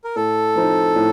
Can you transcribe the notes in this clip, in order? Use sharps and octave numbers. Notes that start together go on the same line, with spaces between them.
A#4
A2 A4
F3 C4 D#4
A2